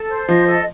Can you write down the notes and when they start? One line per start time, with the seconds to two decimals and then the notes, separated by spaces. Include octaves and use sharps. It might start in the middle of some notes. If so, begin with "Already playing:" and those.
Already playing: A4
0.09 C5
0.28 F3 D#5
0.47 A4